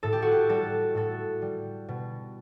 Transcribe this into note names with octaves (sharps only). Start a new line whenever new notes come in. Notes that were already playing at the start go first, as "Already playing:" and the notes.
A2 A4
G4
F#4
G4
G3 F#4 A4
A2 F#4 A4
G3
B2